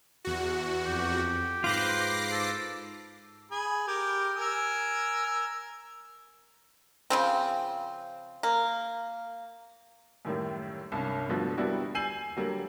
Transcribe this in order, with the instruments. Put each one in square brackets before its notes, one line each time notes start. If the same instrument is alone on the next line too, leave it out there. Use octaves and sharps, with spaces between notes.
[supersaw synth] E2 F#4
[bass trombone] F2 [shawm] G4
[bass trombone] G#2 [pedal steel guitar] F4 B4 C5 [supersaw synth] D6 A#6 C7
[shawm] A4
[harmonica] G#4 B5
G4 A#4
A#4 G#5 E6
[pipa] C#3 F3 C4
A#3
[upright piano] F#2 A2 D#3 G3 A#3
C2 G2 C#4
G2 D3 F3 A3 B3 F#4
G3 A#3 B3 D4 E4 F#4
G#5 E6 G6 C7 D#7 F#7
D3 F#3 G3 A#3 G4